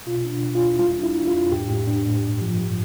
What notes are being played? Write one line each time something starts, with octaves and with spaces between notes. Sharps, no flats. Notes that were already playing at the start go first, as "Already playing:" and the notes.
B2 F4
D4
B2
F4
E2
E4
G3 F4
D4
E4
D4
F4
F2
A2 G4
A2
D4
A2
G2
F3
G2